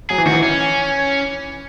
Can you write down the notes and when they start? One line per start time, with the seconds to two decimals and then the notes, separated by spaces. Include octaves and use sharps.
0.10 F#3 G#4
0.18 E3
0.26 D#3 F#4
0.33 E3
0.43 C#4